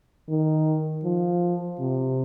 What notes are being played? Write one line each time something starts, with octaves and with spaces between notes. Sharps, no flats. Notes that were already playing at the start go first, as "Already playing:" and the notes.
D#3
F3
C3